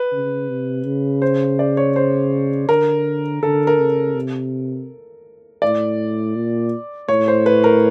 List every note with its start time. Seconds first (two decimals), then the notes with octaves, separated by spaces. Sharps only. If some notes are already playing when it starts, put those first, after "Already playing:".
Already playing: B4
0.12 C#3
0.49 C3
0.86 C#3
1.22 C5
1.59 D5
1.77 C#5
1.96 C5
2.69 D3 A#4
3.43 D3 A4
3.67 A#4
3.79 C#3
4.15 C3
5.62 A2 D5
6.36 A#2
7.08 A2 C#5
7.28 C5
7.46 B4
7.64 A#4